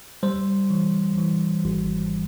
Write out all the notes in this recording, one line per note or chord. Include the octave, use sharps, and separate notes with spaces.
G3 C5
E3
E3
G#1